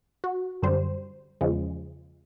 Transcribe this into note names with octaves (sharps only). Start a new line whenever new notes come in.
F#4
F#2 D3 G3 C5
E2 C#3 F3 G#3